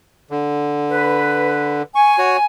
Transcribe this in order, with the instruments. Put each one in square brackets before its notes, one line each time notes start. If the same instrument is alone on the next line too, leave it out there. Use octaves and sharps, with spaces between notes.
[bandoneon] D3
[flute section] B4
[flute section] G#5 [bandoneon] C#6
[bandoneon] F#4 C#5